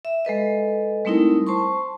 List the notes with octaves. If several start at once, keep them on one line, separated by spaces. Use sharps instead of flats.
E5
G#3 A4 B4 D#5
G3 A3 C4 D#4 E4 A#4
C5 A5 C6 C#6